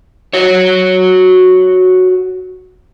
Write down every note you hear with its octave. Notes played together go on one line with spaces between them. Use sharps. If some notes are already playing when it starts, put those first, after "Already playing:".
F#4 C#5